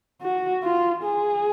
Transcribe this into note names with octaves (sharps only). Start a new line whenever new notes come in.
F#4
F4
G#4